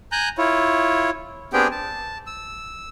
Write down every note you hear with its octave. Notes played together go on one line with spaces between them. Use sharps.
G#5 A#5 F#6 G6
E4 F4 C#5
B3 C4 D4 G4 G#4 G5
A5
E6